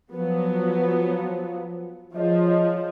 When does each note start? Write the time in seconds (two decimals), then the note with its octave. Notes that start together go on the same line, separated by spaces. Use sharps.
0.12 F3 F#3 B3
2.15 F3 G#4 C#5 D#5